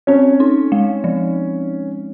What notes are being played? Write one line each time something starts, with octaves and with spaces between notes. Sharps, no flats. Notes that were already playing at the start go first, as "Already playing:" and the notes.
C4 C#4
D#4
G#3
F3